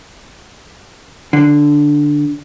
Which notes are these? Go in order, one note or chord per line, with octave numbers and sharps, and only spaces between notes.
D3